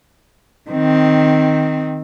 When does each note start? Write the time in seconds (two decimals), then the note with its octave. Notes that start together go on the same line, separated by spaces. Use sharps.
0.70 D#3 C4